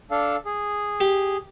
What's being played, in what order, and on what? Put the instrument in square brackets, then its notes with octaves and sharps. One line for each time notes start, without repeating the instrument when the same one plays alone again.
[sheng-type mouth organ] D4 A4 F5
G#4
[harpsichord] G4